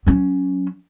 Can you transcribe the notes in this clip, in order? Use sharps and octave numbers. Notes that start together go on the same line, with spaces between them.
F#3 C#4